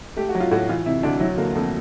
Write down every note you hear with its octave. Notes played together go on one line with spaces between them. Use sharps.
A3 G4
F#4
F#3
F4
A2 F#4
E3 F4
C3 E4
D2 D4
F#3 E4
D3 A#3
F2 A3